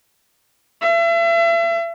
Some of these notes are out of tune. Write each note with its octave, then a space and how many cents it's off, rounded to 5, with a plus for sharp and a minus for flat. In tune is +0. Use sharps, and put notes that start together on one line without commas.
E5 +40